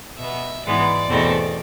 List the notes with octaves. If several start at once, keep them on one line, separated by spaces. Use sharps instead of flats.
B2 B3 E5
G#2 E3 G#3 B3 D5
E2 B2 A3 C4